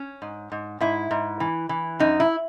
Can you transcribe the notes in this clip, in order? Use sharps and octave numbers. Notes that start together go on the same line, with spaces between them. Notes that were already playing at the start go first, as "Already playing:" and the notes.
Already playing: C#4
G#2
G#2
G#2 E4
G#2
E3
E3
F#2 D#4
E4